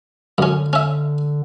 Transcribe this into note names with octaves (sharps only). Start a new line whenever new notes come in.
F#2 D3 C#4
C#4 E5